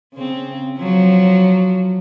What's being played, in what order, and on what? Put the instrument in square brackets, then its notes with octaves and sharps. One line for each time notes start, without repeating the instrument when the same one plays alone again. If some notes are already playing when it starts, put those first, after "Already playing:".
[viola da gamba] C#3 C4
F3 F#3